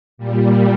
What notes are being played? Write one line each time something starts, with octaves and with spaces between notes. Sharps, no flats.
A#2 G3